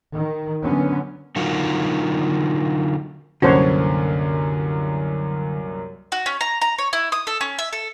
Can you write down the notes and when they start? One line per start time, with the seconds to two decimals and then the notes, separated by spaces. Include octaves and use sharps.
0.14 D#3
0.62 D3 F#3 B3 C#4
1.36 D3 F#3 D#4 F4 F#4 A#4
3.42 C2 F#2 D3 A#3 C#4 F#4 C5 C#5
6.12 F#4
6.26 C#4
6.41 A#5
6.61 A#5
6.78 C#5
6.93 E4
7.12 D#6
7.27 A4
7.41 C#4
7.59 E5
7.73 A4